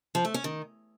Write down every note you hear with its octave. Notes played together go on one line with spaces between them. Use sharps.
F3
A3
C#4
D#3